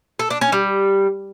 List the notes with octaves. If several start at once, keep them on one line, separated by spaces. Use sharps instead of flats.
A4
D4
C#4
G3